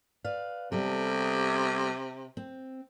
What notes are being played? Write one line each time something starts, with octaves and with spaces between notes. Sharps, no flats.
B4 D5 F5
C3 G3 B3 A4
C4